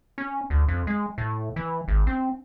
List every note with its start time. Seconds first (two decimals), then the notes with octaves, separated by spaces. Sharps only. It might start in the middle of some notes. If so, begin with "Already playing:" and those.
0.18 C#4
0.50 D2
0.68 F2
0.87 G#3
1.18 A2
1.56 E3
1.88 G#1
2.07 C4